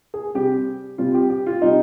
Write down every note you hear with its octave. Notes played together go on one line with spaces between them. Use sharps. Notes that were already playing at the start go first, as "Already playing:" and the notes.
G#4
C3 G3 C4 G4
C3 G3 C4 F4
G4
G4
F4
C3 G3 C4 D#4